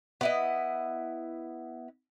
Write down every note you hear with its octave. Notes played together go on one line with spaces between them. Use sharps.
B3 E4 D#5